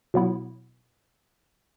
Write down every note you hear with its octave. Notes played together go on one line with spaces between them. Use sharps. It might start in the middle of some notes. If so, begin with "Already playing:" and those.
B2 F#3 B3 E4